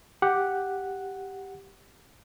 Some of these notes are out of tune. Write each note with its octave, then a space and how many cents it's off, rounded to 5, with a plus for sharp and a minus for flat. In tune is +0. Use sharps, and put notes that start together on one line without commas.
G4 +0 F#5 +0